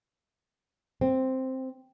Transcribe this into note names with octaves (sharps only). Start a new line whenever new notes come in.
C4